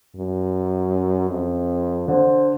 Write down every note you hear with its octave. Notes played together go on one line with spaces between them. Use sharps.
F#2
F2
D3 C5